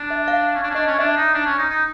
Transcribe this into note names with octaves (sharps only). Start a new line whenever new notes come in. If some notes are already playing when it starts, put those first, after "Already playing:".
Already playing: D4
E5
F5
C#4
D4
C#4
D4 D#5
C#4
D4 E5
D#4
D4
C#4
D#4
D#4